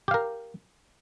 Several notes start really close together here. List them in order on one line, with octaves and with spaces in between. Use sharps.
G4 F5 A#4